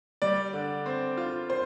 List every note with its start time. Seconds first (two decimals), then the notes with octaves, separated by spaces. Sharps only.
0.22 G3 D5
0.53 D3
0.86 C4
1.17 F4
1.50 C5